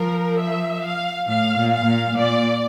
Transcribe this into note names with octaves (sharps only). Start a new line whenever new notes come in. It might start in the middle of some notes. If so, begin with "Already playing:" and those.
Already playing: F3 A#4
E5
F5
A2 F5
A#2
F5
A#2
A#2 D5